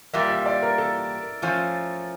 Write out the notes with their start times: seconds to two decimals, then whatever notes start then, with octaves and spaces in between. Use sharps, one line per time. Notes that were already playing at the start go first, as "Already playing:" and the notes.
0.14 A#2 G3 A#3 E5
0.30 E5
0.46 D5
0.63 A#4
0.78 A4
1.42 F3 A3 C#4